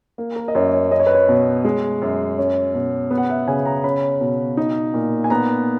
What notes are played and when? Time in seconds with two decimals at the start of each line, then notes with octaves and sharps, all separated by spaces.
0.18 A#3
0.36 A#4
0.48 D#5
0.55 F#2 C#5
0.73 C#5
0.91 C#4 D#5
0.99 C#5
1.07 B4
1.15 C#5
1.29 B2
1.65 G#3
2.02 F#2
2.38 C#4
2.74 B2
3.11 B3
3.18 F#5
3.30 E5
3.47 C#3 G#5
3.66 A#5
3.84 C#4 B5
4.21 B2
4.57 D#4
4.94 A#2
5.24 G#5
5.30 B3 A#5